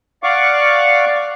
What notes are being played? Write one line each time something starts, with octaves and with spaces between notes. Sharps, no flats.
D5 F5 F#5 C#6 D6